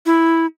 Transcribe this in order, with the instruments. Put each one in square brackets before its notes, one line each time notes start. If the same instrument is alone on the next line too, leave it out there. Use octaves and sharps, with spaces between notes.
[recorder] E4